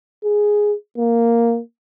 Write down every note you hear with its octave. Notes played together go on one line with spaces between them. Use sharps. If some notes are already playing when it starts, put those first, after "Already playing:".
G#4
A#3